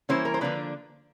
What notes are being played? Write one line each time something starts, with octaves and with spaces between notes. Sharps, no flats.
E3 G3 A#3 C#4 E4 C5
A#4
C5
D3 F3 A#3 D4 B4